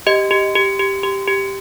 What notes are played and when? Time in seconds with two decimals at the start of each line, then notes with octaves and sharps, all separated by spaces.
0.07 G4 D#5
0.31 G4
0.55 G4
0.79 G4
1.03 G4
1.28 G4